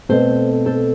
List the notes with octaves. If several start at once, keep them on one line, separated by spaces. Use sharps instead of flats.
B2 A3 C4 A4 C5
A4 C5